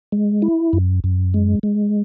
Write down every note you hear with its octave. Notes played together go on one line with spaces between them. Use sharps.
G#3
E4
F#2
F#2
G#3
G#3